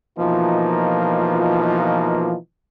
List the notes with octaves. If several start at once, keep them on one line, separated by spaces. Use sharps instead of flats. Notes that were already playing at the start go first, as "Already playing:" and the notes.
B2 E3 F3 A#3 D#4 F4